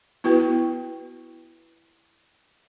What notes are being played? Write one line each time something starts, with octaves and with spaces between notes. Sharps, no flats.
B3 E4 F#4 B4 G5